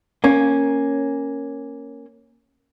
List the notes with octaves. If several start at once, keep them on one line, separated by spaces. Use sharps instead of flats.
A#3 C#4